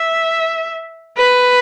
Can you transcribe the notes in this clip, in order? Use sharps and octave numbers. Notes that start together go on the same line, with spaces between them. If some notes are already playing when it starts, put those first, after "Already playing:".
Already playing: E5
B4